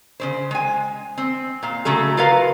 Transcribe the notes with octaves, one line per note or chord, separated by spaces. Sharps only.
C#3 E3 C5
G#3 G#5
C4
A#2 F5
C#3 F#3 A3 A4
F4 F#4 A#4 B4 F5